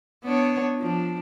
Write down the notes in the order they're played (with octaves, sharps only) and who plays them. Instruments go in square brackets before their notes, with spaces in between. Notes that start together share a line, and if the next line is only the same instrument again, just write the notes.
[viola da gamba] B3 D4 C#5
F3 D4